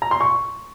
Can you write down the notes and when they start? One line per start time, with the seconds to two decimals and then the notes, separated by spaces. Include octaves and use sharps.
0.02 A#5
0.11 C6
0.21 C#6